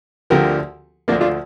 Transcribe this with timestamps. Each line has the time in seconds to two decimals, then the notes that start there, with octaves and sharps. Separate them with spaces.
0.30 D2 D3 F3 G4 A#4
1.08 D2 D3 F3 A#3 D4
1.21 D4 F4